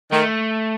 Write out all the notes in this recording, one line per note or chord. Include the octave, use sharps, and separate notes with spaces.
D#3 A3